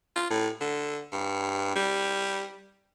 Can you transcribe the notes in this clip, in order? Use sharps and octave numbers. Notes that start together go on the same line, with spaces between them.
F4
A2
D3
G2
G3